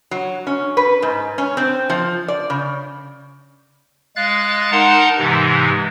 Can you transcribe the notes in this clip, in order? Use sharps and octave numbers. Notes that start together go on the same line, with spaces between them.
F#3
C#4
B4
G#2
C#4
C4
F3
D5
C#3
G#3 F5 F#6 A6
D#4 A#4 F#5 A5 A#5 C6
G#2 C3 E3 G#3